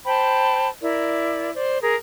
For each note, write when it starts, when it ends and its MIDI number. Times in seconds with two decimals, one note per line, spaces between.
0.05 0.68 72
0.05 0.68 79
0.05 0.68 81
0.05 0.68 83
0.81 1.51 64
0.81 1.51 70
0.81 1.51 74
1.54 1.80 72
1.54 1.80 74
1.82 1.94 68
1.82 1.94 70